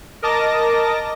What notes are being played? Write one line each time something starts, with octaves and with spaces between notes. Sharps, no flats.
A#4 D#5 A5 D6 A#6